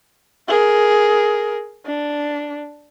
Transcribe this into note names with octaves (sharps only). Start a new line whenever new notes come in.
G#4 A#4
D4